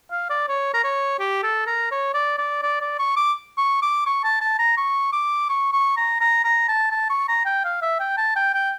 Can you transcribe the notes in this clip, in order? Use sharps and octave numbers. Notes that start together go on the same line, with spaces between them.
F5
D5
C#5
A#4
C#5
G4
A4
A#4
C#5
D5
D5
D5
D5
C#6
D6
C#6
D6
C#6
A5
A5
A#5
C#6
D6
C#6
C#6
A#5
A#5
A#5
A5
A5
C#6
A#5
G5
F5
E5
G5
A5
G5
G5